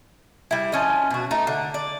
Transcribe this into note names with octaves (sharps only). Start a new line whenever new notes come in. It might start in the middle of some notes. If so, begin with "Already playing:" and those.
G3 E4
F3 C#4 D#5
B2 F#4
A3 D#4
D3
D5